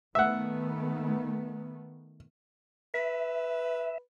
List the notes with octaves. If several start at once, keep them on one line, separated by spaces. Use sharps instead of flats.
D#3 A3 B3 E5 F#5
B4 E5